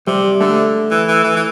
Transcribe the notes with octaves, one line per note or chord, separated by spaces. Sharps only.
C3 G3
D3 A3
E3
E3
E3
E3